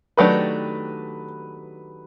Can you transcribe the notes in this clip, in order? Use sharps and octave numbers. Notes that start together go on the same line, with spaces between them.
D#3 F#3 A3 D4 G4 B4